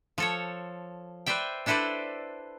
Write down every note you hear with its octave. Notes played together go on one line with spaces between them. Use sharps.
F3 A4 C#5
B4 C5 D5 E5 G5
D4 E4 A4 B4 C5 D5